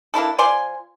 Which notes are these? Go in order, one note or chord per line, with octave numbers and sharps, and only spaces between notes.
A#3 D4 E4 A4
F3 D5 G#5 C6